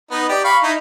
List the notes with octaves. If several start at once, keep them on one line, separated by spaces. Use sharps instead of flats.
B3 D#4
G4 D5
F5 B5 C#6
D#4 E4